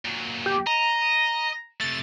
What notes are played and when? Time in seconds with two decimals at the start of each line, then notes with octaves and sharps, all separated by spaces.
0.05 A#2 F#3
0.46 G4
0.67 D#5 A#5
1.81 C3 A3 A6